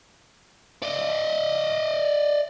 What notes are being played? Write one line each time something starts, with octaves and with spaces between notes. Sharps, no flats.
D5 D#5